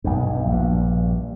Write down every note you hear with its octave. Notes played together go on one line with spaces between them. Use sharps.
B1 G2
A#1 G2